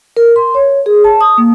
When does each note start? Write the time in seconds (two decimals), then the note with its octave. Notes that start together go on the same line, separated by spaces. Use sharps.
0.17 A#4
0.36 C6
0.55 C#5
0.86 G#4
1.04 A5
1.21 D#6
1.38 A#3